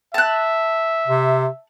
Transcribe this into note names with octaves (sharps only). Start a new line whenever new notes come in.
E5 A5 F#6
C3